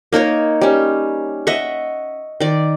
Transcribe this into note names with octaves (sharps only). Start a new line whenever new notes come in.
A#3 D#4 A#4 C#5
G3 C#4
D#5 E5 F#5 C#6
D#3 D5